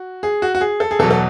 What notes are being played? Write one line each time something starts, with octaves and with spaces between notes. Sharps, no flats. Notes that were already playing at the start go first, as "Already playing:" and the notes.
Already playing: F#4
G#4
F#4
F#4
G#4
A4
G#4
E2 B2 F#3 A4
A4